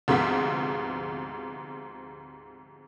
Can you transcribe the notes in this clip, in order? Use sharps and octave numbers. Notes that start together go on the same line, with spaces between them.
D2 G#2 C3 F3 B3 B6